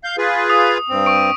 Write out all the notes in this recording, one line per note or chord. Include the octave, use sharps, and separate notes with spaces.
F5 G6
F4 G#4 B4
D#6
G2 C4
C#6 D7